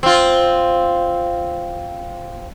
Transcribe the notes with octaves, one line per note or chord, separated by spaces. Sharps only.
C4 F4